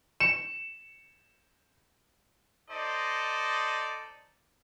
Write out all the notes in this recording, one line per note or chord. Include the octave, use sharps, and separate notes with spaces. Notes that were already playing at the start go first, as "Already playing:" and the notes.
C#7 E7
D#4 A4 C5 D5 D#5